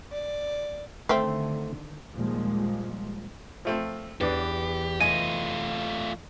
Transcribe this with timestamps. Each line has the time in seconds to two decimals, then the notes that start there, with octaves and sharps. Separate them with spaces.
0.11 D5
1.09 D3 D#3 A3 C4 C5 E5 F5
2.14 D#2 A#2 F3 G3 G#3 A#3
3.65 F3 A3 C4
4.21 E2 B3 D4 G4
5.01 A3 F4 D#5 G#5 D#7